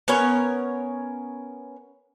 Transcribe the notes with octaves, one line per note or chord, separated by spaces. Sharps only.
B3 C#4 A#4 C#5